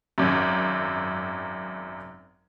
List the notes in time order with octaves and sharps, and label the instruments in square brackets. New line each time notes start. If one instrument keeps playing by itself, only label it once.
[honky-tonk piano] G#1 F#2